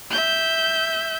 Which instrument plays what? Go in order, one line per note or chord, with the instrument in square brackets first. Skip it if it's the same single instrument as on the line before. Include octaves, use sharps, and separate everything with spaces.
[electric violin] E5 G6